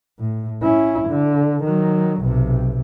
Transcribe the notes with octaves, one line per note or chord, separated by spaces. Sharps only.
A2
C#4 E4
D3
D#3 F#3
B1 C3